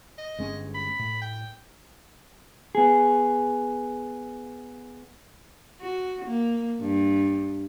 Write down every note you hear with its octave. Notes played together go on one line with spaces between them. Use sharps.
D#5
G1 G#3 C#4
B5
A2
G5
B3 G#4
F#4
A#3
G2